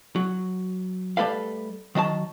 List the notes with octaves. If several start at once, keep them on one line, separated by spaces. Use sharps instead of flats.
F#3
G3 A3 A4 B4 F5
D#3 F#3 D#5 A5